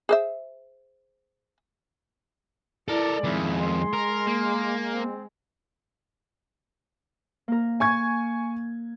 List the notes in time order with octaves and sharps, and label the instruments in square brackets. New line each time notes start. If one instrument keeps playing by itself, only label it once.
[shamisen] G#4 C5 E5
[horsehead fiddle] E4 D5 [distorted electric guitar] A4 A#4
[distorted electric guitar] F2 D#3 [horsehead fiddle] G#3 [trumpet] E4
[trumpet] C6
[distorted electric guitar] A#4
A#3
[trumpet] C4
[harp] A#3 A#4
[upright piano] G#5 C#6 G#6